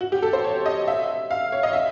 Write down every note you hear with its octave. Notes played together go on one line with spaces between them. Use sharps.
F#4
G4
A4
C5
C#5
D#5
E5
F5
C#5
D#5
E5